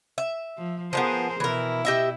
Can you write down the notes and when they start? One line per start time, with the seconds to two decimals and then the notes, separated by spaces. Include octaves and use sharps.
0.18 E5
0.58 F3
0.93 F3 G#3 B3 G#4 A#4 C5
1.40 B2 E3 E4 A#4
1.85 G4 D#5 E5